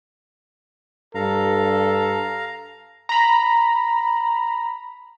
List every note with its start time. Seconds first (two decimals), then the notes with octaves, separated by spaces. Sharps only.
1.15 G2 A4 F5 A#5
3.09 A#5 B5